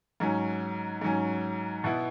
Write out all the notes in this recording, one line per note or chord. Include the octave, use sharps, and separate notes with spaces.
G#2 F#3 C#4
G#2 F#3 C#4
B2 B3 E4